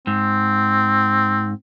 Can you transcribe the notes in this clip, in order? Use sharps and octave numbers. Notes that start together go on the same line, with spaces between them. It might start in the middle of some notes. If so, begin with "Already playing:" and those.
G#2 C4